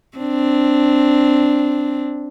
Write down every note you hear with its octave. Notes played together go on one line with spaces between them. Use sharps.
C4 D4